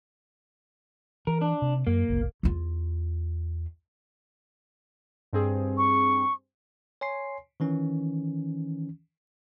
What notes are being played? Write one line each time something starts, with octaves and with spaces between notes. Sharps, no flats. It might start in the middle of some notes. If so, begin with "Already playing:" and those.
E3 A#4
D4
C3
F#2 A#3
F#1 C2
E2 F4
G2 C4 G#4
C#6
C#5 G#5 C6 C7
D#3 E3 C#4